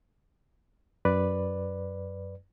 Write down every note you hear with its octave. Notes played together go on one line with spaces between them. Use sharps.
F#2 B4 D5